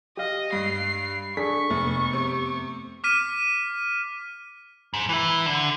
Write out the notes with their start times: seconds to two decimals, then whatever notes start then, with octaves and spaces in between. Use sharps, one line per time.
0.17 G4 D#5 F5
0.52 G2 C7
1.37 D4 G#4 A4 C#6 B6
1.70 F1 F2 A3 B3
2.13 C3
3.04 D6 F6 B6 D#7
4.94 G#2
5.09 E3 E4
5.46 D3